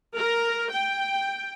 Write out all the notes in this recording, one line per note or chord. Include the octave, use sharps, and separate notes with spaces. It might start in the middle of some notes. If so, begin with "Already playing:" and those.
A#4
G5